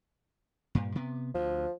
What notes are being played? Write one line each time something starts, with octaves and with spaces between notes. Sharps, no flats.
G2 A#2
C3 B3
D2 F3